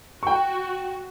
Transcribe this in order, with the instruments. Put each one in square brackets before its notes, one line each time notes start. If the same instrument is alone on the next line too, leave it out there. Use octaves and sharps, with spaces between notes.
[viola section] F#4 [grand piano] G5 C#6